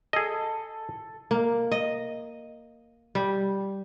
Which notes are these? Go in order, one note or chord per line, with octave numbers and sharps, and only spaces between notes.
G#4 A4 D#5
A#3
D#5
G3